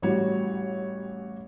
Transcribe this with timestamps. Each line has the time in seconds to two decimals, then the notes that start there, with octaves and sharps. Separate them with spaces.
0.02 A1 G3 F#4 C#5